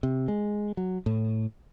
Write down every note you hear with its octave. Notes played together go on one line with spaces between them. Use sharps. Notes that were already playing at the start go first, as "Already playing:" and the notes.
C3
G#3
F#3
A2